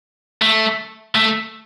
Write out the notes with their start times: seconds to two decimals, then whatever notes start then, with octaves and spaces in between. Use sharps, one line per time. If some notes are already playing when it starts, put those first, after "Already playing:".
0.42 A3
1.15 A3